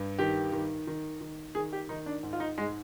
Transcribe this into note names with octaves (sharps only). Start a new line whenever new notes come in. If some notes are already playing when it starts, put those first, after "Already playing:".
Already playing: G2
D#3 G4
D#3
D#3
D#3
D#3 G#4
G4
D#3 D#4
D4
G#2
F4
D#4
G#2 G#3